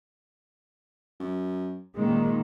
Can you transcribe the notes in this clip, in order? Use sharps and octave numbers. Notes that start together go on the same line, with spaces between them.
F#2
D#1 A#2 D#3 G#3 A#3